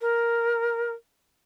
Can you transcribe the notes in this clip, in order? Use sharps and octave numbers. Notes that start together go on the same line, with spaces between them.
A#4